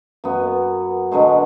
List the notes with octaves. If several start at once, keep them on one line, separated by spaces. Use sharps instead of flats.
F#2 B3
B2 D3 F#3 G#3